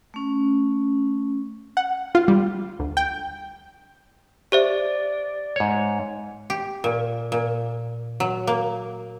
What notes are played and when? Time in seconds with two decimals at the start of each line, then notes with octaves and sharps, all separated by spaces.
0.14 A3 C#4
1.77 F#5
2.15 F4
2.28 G3
2.79 D2
2.97 G5
4.52 G4 C5 D5 E5
5.56 G#2 C#5
6.50 G4
6.84 A#2
7.32 A#2
8.20 F#3
8.47 A#3